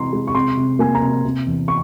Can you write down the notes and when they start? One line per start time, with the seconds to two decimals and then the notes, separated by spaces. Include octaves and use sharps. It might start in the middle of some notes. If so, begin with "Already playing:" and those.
Already playing: C3 E3 G#3 A#5 C6
0.13 G#3
0.27 C#6
0.35 C3 C6
0.57 C3
0.79 A#3 G#5
0.95 A#5
1.02 C3
1.24 C3
1.46 E2
1.68 C#6